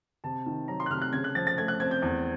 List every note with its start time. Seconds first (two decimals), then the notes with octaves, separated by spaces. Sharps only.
0.24 C3 A5
0.46 D#3
0.68 F#3 A#5
0.80 C6
0.86 F#6
0.90 C3 F6
1.02 F#6
1.13 C#3 G#6
1.24 F#6
1.35 F3 A6
1.47 A6
1.58 A3 G#6
1.68 F#6
1.80 C4 G#6
1.91 G6
2.02 E2